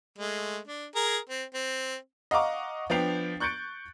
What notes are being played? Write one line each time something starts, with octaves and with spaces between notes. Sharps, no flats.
G#3 A3
D4
G#4 A#4
C4
C4
D#5 F5 F#5 A#5 C#6 D6
F3 B3 D4 G5 C7 F7
C#6 F#6 G6 A6 C#7 D7